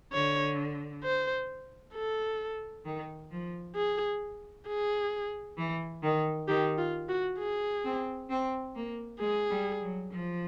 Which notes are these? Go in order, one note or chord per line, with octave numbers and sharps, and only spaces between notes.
D3 C#5
C5
A4
D#3
F3
G#4
G#4
E3
D#3
D#3 G4
F4
F#4
G#4
C4
C4
A#3
G#3 G#4
G3
F#3
F3